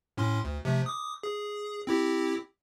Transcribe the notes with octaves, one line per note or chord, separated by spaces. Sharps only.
A2 C#4 C6
D2
C3 F3 A3
D6 D#6
G#4
C4 E4 G4